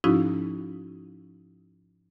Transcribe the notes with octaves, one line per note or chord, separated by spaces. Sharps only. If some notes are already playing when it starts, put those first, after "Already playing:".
G#2 F3 C#4 D#4 E4 F#4